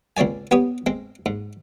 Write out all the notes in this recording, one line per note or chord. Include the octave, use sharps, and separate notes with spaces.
C#2 C4 C#5 D5 G#5
B3 G4 C#5 D#6
G#3 C4
G#2